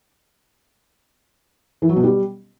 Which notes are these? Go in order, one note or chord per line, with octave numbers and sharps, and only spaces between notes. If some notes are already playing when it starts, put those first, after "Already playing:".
E3
F#3
B2
G3